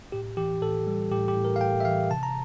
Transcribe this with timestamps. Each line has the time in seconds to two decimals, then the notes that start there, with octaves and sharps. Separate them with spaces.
0.12 A2 G4
0.37 E3 G4
0.62 A2 A4
0.87 G3
1.12 A2 G4
1.28 G4
1.36 A2
1.45 A#4
1.56 F5
1.61 A2 G5
1.80 E5
1.85 E3 F5
2.10 C3 A5
2.23 A#5